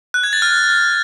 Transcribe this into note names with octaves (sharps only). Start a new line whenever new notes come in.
F#6
G#6
A6
F6